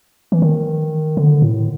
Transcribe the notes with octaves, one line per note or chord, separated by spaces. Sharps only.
E3
D#3
D3
A2